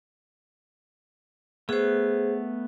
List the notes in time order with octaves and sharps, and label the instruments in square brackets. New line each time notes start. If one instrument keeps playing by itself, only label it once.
[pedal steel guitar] A3 B3 [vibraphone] G#4 C5